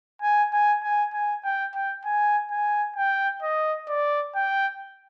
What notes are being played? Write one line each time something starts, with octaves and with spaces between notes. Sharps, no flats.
G#5
G#5
G#5
G#5
G5
G5
G#5
G#5
G5
D#5
D5
G5